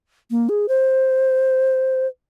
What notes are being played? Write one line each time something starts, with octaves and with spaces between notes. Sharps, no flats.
A#3
G#4
C5